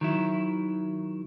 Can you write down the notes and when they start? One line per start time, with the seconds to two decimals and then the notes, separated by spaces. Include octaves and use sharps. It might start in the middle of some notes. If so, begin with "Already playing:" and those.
0.01 D#3 F#3 E4